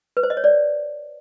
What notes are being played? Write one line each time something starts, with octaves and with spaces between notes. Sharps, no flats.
B4
C5
D#5
C#5
D5